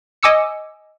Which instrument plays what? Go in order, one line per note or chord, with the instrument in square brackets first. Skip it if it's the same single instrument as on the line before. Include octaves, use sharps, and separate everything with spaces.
[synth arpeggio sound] D#5 G#5 D6 E6 C#7